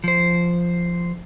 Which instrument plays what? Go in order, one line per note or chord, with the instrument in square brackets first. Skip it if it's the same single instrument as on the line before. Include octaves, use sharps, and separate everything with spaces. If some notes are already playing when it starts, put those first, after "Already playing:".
[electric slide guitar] F3 C5